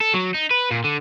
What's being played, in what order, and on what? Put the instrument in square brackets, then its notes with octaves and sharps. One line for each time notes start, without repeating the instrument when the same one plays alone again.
[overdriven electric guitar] A4
F#3
D#4
B4
A#2
D3